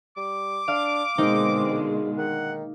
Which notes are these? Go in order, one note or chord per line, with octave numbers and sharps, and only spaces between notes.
G3 D6
D4 F5
B2 D3 G#3 A#3 C4 D#4
D#3 F#5